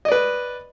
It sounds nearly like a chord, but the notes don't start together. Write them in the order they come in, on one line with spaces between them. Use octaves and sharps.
D#5 D5 B4